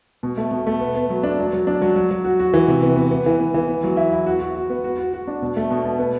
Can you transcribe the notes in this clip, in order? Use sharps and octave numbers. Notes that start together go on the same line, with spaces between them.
B2
A3
B2
A3
B3
B3
F#3
D4
F#3
F#3
D4
F#3
F#3
F#3
F#4
F#4
E3
C3
B3
B3
B3
E3
B3
E3
B3
F#3
E4
E4
F#4
F#4
F#4
B3
F#4
F#4
F#4
D4
B2
A3
B2
B2
B3